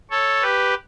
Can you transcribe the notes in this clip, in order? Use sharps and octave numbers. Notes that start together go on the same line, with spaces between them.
A4 C#5
G4 B4